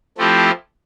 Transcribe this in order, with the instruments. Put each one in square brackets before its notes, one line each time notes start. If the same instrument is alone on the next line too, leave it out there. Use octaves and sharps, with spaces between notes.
[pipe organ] F3 A3 C4 E4 G4